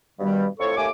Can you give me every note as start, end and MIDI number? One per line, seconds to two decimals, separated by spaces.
0.20 0.46 43
0.20 0.46 47
0.20 0.46 51
0.20 0.46 55
0.60 0.74 41
0.60 0.74 45
0.60 0.74 69
0.60 0.74 73
0.60 0.74 85
0.76 0.89 39
0.76 0.89 57
0.76 0.89 80
0.76 0.89 86